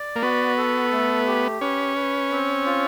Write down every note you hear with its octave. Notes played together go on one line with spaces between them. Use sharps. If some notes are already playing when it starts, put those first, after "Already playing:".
Already playing: D5
A#3
B3 F#4
A4
A3
G4
C#4 B4
B4
C4
F4